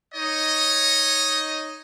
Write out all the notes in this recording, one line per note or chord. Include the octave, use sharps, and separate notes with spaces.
D#4 C#5 D#5